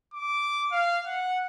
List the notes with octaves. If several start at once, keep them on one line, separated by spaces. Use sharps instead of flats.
D6
F5
F#5